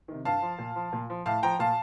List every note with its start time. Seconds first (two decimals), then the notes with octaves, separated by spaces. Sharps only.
0.08 C3 D#3
0.25 G2 F5 A5
0.42 F3
0.59 A#2
0.76 F3
0.93 A#2
1.10 F3
1.26 A2 F5 A5
1.43 F3 G5 A#5
1.59 A#2 F5 A5